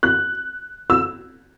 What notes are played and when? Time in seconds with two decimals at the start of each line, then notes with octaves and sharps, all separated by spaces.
0.03 F#6
0.90 E6